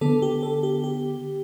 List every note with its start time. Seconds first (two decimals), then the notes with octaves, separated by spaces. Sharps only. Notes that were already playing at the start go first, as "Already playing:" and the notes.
0.01 D3 B3 A4
0.22 G4
0.43 A4
0.63 G4
0.84 G4